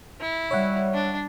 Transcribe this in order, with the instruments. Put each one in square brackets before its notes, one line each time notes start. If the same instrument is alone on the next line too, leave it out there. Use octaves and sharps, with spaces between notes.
[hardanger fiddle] E4
[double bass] G3 [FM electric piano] C#5 E5 F#5
[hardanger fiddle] D4